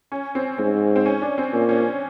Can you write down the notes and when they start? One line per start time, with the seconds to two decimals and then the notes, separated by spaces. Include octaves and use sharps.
0.12 C#4
0.35 C4
0.58 G#2 C4
0.96 C4
1.06 C#4
1.22 D4
1.38 C4
1.53 A#2 C#4
1.69 C#4
1.76 D4